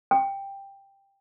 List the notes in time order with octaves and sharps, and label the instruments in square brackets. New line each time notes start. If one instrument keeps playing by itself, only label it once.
[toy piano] G5